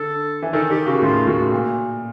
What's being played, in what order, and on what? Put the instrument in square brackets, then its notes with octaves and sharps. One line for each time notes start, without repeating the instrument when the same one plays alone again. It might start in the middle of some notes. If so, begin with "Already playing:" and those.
Already playing: [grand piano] D3 [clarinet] A4
[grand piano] E3
[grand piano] D#3 [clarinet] A4
[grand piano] D#3 [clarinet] G4
[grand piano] C#3 [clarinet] F#4
[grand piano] A2 [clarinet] F4
[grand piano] A2 [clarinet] F#4
[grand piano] A#2